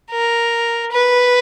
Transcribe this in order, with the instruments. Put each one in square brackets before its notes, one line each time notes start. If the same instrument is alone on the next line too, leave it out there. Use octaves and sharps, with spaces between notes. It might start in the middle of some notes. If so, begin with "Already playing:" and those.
[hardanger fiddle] A#4
B4